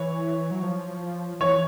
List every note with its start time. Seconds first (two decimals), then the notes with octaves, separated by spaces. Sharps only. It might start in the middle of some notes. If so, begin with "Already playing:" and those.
Already playing: E3 C#5
0.51 F#3
0.62 F3
1.41 E3 C#5